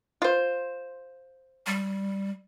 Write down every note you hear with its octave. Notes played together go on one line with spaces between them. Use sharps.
F4 C5
G3